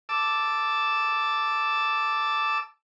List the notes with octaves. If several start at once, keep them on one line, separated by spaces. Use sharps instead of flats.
A5 D6 E6